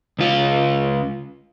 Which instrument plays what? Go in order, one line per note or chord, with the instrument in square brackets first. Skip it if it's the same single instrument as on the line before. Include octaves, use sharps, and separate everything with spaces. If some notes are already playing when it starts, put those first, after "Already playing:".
[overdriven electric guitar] C#2 F4